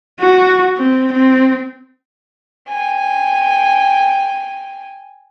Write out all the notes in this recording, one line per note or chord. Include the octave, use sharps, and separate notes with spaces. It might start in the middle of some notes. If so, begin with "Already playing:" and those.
F#4
C4
C4
G5 G#5